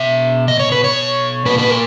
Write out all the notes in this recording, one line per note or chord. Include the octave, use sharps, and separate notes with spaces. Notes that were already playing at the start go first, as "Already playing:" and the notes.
Already playing: B2 E5
D#5
C#5
B4
C#5
A#2 B4
B4
A#4